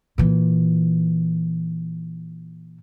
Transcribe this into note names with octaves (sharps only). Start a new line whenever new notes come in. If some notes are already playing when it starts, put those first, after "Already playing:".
A#2 E3